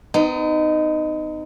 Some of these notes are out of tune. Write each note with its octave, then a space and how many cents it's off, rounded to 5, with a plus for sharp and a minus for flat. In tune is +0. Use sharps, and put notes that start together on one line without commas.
B3 +40 D#4 -10